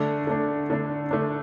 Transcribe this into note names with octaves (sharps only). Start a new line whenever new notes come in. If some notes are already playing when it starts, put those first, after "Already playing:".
Already playing: D3 A3 D4
D3 A3 D4
D3 A3 D4
D3 A3 D4